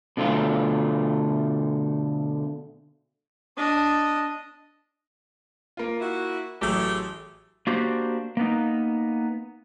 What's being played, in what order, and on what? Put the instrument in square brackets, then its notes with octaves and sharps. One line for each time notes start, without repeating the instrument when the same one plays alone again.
[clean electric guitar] B2 D3 A3 F4
[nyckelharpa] D4 D#5
[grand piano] A#3 F4
[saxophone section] E4 F#4
[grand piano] A1 F#3 [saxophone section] A3 G4 G#4
[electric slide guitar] A#3 D4 F#4 G4 C5
A#3 B3 D#4